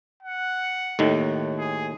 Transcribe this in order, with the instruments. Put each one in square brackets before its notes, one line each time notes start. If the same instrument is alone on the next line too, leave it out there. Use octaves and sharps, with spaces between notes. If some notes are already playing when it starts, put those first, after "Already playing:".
[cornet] F#5
[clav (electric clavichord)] D#2 A2 D#3
[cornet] G#4